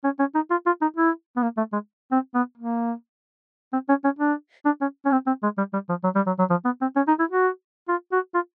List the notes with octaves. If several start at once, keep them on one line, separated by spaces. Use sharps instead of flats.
C#4
C#4
D#4
F4
F4
D#4
E4
B3
A#3
A3
G#3
C4
B3
A#3
C4
C#4
C#4
D4
D4
C#4
C#4
C4
C4
G#3
G3
G3
F3
F#3
G3
F#3
F#3
F3
B3
C4
C#4
D#4
E4
F#4
F4
F#4
F4